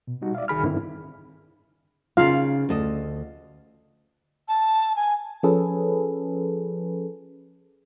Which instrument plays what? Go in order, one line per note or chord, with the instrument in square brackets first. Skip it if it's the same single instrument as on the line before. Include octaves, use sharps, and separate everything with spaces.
[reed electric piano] B2
G3 D#4 F#4
D5 E5 F5
C2 D#3 G#4 B5 F6
G2 D3 D#3 C4 E4
[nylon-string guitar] C#3 D#4 [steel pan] F4 F5
[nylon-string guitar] D2 A4 D#5
[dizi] A5
G#5
[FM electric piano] F3 C#4 G#4 A4 B4